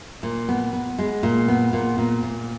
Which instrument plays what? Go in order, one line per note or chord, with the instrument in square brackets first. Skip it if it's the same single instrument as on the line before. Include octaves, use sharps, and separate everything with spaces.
[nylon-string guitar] A#2
B3
B3
G#3
A#2
B3
A#2
A#2
A#2